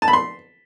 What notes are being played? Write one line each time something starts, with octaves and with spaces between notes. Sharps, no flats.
A5
B5
C6